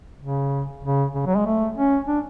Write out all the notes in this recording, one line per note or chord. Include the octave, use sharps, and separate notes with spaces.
C#3
C#3
C#3
F#3
G#3
A3
C#4
D4